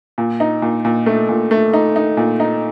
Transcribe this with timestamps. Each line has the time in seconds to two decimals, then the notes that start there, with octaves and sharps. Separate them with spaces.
0.18 A#2
0.40 D#4
0.62 A#2
0.85 A#2
1.06 A3
1.29 A#2
1.51 A3
1.73 D#4
1.96 D#4
2.17 A#2
2.40 D#4